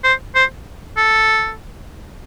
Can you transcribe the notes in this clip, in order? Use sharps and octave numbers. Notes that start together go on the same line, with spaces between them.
C5
C5
A4